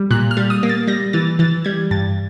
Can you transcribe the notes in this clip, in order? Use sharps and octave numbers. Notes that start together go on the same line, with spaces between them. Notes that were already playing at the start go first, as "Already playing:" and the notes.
Already playing: G3
A#2 F#6
F6
G3
D#6
A#3
A6
G3 A#6
E3 A6
E3 A6
G3 G#6
G2 A6